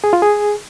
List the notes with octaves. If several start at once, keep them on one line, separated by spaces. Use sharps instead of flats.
G#4
F4
G#4